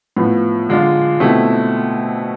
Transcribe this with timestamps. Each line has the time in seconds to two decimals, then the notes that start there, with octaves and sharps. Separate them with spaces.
0.17 A2 F3 B3
0.69 D3 G#3 D4 F4
1.20 B2 A3 C4 E4